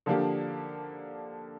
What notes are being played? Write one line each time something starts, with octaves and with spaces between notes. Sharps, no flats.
D3 F3 A#3 D4 G4